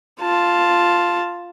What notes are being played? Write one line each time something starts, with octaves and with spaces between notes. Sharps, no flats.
F4 A5